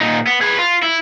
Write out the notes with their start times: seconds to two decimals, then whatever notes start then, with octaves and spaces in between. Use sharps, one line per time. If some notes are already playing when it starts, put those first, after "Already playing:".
0.01 A#2 D#4
0.27 B3
0.41 G#4 B4
0.59 F4
0.83 E4